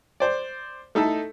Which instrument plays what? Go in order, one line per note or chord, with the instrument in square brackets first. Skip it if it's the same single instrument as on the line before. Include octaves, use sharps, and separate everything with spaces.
[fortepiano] C5 D5
A3 D#4 E4 A4